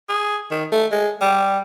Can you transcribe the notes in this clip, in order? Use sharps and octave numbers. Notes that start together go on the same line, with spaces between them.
G#4
D#3
A3
G#3
G3